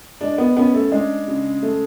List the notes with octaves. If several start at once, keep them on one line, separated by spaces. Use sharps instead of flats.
G#3 D4
B3
B3 C#4
A3
G#3 D4
C#3
A3